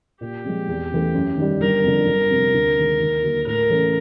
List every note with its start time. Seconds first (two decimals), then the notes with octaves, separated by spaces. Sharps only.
0.21 A#2 G4
0.45 F3 G#3 C4
0.68 E2
0.91 C#3 E3 A3
1.14 F#2
1.37 D#3 G3
1.61 G1 A#4
1.83 F2 D3
2.07 G1
2.30 F2 C3
2.54 D2
2.76 C3 D#3 G#3
3.00 D#2
3.23 D3 F#3 A#3
3.46 A2 A#4
3.70 E3 A3 C#4